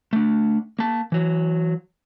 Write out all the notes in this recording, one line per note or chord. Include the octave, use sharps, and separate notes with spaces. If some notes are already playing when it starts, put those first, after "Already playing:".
A3 D4
A#3 A5
E3 F#3